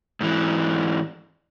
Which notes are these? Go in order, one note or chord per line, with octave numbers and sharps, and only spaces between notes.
G#2 E3